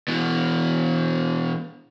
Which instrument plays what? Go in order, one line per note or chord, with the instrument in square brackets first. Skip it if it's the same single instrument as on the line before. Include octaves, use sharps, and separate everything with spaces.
[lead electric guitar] B2 E3